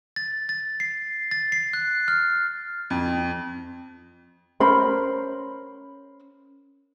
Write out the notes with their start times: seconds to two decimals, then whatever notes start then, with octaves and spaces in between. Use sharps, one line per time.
0.16 A6
0.49 A6
0.80 C7
1.31 A6
1.52 C7
1.73 F#6
2.08 F6
2.90 F2
4.60 C#4 A#4 C5 B5